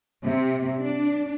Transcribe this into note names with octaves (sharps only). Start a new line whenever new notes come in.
C3
D4